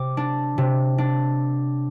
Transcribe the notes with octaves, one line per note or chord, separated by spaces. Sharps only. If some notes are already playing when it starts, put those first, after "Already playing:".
Already playing: C3 D6
D4
C3
D4